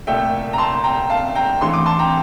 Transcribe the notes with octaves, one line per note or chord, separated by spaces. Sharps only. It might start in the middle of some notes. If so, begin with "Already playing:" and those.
C2 A#2 A3 E5 G5
A#5
A5 C6
G5 A#5
F5 A5
G5 A#5
G2 E3 A3 C6
D6
A5 C6
G5 A#5